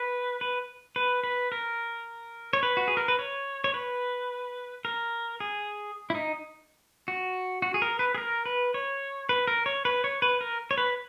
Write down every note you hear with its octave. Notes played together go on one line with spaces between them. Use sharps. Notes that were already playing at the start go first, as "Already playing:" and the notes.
Already playing: B4
B4
B4
B4
A#4
C#5
B4
F#4
G#4
A#4
B4
C#5
C#5
B4
A#4
G#4
E4
D#4
F#4
F#4
G#4
A#4
B4
G#4
A#4
B4
C#5
B4
A#4
C#5
B4
C#5
B4
A#4
C#5
B4